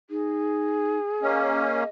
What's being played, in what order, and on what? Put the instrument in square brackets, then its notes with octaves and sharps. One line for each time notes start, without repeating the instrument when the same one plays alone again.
[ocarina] D#4 [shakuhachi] G#4
[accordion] A#3 C#4 [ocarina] D#5